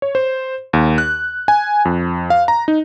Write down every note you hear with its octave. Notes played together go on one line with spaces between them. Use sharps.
C#5
C5
D#2
F#6
G#5
F2
F5
A#5
D#4